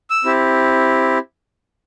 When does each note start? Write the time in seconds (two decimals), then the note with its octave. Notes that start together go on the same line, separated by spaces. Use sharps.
0.10 E6
0.25 C4 E4 G4